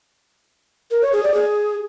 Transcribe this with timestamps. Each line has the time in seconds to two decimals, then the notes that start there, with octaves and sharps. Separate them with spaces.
0.91 A#4
1.02 C#5
1.12 G#4
1.23 D5
1.34 G#4